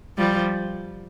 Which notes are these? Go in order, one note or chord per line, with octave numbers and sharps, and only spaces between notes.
F3 G3